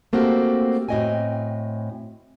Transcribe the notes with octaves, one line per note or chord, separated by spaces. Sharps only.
A3 A#3 C4 F#4 G4
A2 C4 F#4 D#5 G5 G#5